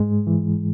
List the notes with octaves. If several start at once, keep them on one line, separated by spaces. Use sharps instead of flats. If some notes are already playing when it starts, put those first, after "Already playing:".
Already playing: G#2 G#3
E3